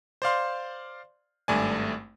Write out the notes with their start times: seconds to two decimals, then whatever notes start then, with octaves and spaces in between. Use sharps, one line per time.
0.22 C5 D5 F5 C6
1.48 G#1 G2 A3 D5 G#5